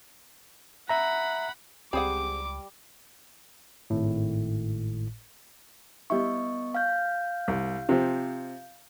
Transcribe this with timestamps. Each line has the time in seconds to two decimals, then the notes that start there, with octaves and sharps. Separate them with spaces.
0.89 E5 F#5 A#5 B5
1.93 C#2 G3 C4 G#4 F#5 D6
3.90 G#1 A2
6.10 G3 B3 E4 D#5 C#6
6.74 F5 F6 G6
7.48 C2
7.89 C3 F3